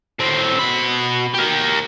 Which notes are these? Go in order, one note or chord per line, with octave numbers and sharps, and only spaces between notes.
A2 C4
B2 B5
G4 A#4